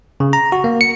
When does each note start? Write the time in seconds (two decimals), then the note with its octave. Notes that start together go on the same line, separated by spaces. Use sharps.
0.20 C#3
0.33 A#5
0.52 F#4
0.64 A#3
0.81 C#7